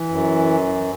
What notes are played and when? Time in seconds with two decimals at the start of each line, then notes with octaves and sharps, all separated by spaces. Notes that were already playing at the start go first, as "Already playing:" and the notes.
Already playing: E3
0.09 F#2